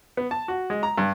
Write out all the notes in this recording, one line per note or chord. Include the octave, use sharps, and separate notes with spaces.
B3
A5
F#4
G#3
A#5
G2